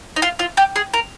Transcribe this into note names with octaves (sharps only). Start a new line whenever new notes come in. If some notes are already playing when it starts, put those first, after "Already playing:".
D#4
F4
F4
G4
G#4
A#4